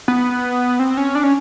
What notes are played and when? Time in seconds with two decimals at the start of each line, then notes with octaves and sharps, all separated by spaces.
0.08 B3
0.79 C4
0.97 C#4
1.15 D4
1.23 C#4